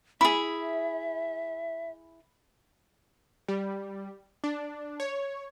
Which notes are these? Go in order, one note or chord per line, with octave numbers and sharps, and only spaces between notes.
E4 G#4 E5 B5
G3
D4
C#5